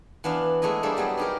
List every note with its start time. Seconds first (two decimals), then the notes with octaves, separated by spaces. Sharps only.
0.24 E3 B3 D4 F5
0.62 G#3 A3 B3 E4 D#5
0.83 G3 A#3 D4 G#4 A4 C5
0.97 F#3 G3 B3 G#4
1.17 C4 D#4 G4 G#4 A#4